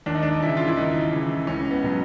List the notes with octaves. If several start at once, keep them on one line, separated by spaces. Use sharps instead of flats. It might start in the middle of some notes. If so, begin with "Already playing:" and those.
D#2 D4
D#4
D4
C#3 E3 E4
F4
E4
D#2 D#4
C#3 E3
C#2 C#4
B3
B2 F#3